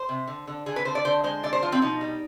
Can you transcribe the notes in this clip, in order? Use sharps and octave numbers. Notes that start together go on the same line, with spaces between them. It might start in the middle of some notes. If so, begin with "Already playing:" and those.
Already playing: C5
C3
D3
D3
D3 G#4
B4
D3 C5
D5
D3 C5
G#3 C5
D3 D5
C5
F3 F4
C4
B2 D#4
G3